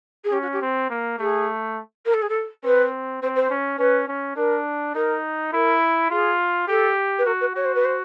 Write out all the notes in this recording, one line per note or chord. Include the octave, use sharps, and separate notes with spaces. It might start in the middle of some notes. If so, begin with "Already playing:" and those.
G#4
C#4 G4
F#4
G4
C4
A#3
A3 G#4
A#4
A4
G#4
A4
C4 B4
C4 C5
C5
C#4
C#4 B4
C#4
D4 A#4
D#4 A#4
E4 A#4
F4 G#4
G4 A4
B4
F#4 A#4
B4
F#4 C#5
C5
B4
C5